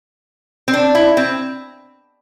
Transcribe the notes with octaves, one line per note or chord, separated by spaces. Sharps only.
C4
D4
E4
C4